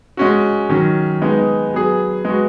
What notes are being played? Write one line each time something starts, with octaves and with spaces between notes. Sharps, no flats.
G#3 C#4 F#4
D#3 F#3 C#4
G#3 B3 D#4
F#3 B3 G#4
G#3 B3 F#4